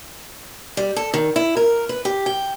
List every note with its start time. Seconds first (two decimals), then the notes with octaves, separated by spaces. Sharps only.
0.77 G3
0.96 A4
1.14 D#3
1.36 E4
1.57 A#4
1.89 B4
2.05 G4
2.26 G5